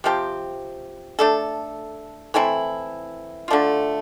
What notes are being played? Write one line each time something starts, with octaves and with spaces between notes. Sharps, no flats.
C3 F3 C4 G4
A3 D4 A4
E3 A3 C4 E4
D3 A3 D4 F4